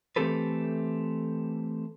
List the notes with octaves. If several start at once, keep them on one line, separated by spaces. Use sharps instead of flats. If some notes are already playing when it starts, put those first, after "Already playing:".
E3 A3 C4 G4 A4 B4